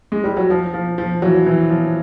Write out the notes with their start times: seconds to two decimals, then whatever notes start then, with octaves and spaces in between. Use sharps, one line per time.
0.12 G#3
0.24 G3
0.37 F#3
0.50 F3
0.74 F3
0.98 F3
1.22 E3 F#3
1.46 E3
1.70 F3